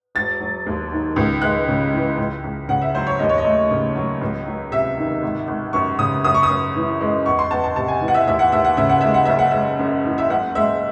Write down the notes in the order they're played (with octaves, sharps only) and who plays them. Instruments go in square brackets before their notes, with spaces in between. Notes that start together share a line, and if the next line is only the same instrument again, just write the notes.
[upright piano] E1 A6
F#3
D#2
D#3
C#2
G#3 F#6
C#3
E3
C#2
C#2
C#3 F#5
E5
F#3 C5
C#5
D#2 D#5
C#5
D#5
A3
C#3
F#3
C#2
F#3
C3 E5
D#3
G#1
G#1
F#2 C#6
C#3 D#6
F#2 D#6
C#6
D#6
F#2
E3
G#3
E2 C#6
C6
E2 A5
A5
C3 A5
G#5
E3
F#5
E5
D#2 E5
F#5
D#2 E5
F#5
C#3 E5
F#5
G#3 E5
F#5
F#1 E5
F#5
G#3 E5
F#2
E3
E5
F#1 F#5
G#3 E5